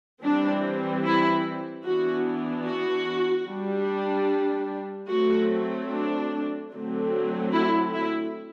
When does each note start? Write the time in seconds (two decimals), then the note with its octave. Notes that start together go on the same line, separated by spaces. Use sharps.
0.23 E3 G3 C4 D4
1.04 E4
1.85 E3 B3 D4 F#4
2.66 F#4
3.48 G3 D4
5.09 F#3 A3 C4 F#4
5.91 D4
6.72 D3 F#3 A3 C4
7.53 E4
7.95 E4